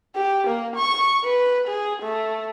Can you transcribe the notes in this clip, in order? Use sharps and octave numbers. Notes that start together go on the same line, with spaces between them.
G4
A#3
C#6
B4
G#4
A3